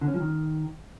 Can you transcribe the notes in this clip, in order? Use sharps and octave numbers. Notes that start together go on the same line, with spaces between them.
D3
C#4
F3
D#3